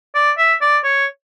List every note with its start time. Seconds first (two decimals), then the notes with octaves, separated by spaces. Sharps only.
0.15 D5
0.38 E5
0.62 D5
0.84 C#5